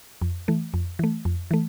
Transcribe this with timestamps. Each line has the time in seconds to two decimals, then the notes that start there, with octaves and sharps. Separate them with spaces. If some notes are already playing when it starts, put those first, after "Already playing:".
0.22 F2
0.48 E3 A3
0.74 F2
0.99 E3 A3
1.25 F2
1.51 E3 A3